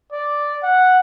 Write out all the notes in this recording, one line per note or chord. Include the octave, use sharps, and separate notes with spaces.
D5
F#5